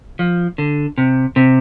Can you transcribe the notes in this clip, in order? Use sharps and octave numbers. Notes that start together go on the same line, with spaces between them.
F3
D3
C3
C3